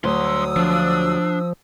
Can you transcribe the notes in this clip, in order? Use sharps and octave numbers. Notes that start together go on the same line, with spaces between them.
D2 G2 F#3 C6 D#6 E6
F3 D4